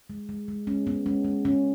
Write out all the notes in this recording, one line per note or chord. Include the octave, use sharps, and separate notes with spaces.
G#3
G#3
G#3
G#3 C#4
G#3 B3
G#3 C#4
G#3
G#3 C#4